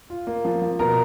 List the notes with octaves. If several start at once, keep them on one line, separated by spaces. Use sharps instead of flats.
F4
A#3
F3
F3
B2 A#4 A#5